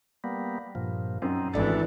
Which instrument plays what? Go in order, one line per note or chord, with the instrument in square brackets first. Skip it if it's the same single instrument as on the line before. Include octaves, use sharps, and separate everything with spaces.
[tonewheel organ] G3 A#3 B3
G2 A#2 F3
[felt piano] F#2 [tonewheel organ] C4 D#4
[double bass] G#1 E3 [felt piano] A3 D4 E4 [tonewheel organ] A4